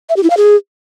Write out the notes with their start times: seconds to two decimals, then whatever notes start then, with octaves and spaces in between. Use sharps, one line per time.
0.10 E5
0.16 G4
0.23 E4
0.30 F5
0.37 G#4